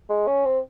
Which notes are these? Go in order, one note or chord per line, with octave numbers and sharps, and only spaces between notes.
G#3
C#4
C4